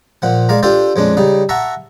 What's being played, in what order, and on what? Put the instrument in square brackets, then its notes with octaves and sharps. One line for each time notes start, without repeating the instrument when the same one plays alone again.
[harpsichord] A#2 F3 F#5
G#3 D5 F5 A#5
D4 F4 G4 A4 C5 D5
F2 G#3 C#4 D4
C#3 G3 D#4
E5 F#5 A5 A#5 C#6